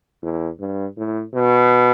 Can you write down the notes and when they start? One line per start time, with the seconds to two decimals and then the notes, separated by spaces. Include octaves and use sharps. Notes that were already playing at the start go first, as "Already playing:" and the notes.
0.23 E2
0.60 G2
0.97 A2
1.34 B2